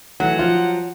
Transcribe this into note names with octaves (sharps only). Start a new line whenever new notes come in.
E3 F#3 A3 F#5
F3 F4